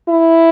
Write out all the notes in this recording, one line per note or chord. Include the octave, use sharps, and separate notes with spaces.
E4